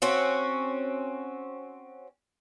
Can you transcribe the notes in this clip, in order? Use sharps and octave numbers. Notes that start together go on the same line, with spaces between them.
C4 C#4 F#4